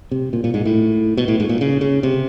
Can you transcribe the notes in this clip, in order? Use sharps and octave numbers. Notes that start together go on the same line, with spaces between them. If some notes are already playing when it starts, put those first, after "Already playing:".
C3
A#2
A#2
G#2
A2
B2
A2
G#2
A#2
C#3
C#3
C3